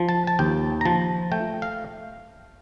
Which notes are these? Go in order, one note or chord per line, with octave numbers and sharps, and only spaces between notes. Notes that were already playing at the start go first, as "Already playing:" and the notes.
Already playing: F3
A5
A5
D#2 G5
A#5
F3 A5
A3 G5
F5